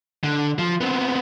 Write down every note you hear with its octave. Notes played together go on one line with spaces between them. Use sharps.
D3
F3
B3 C4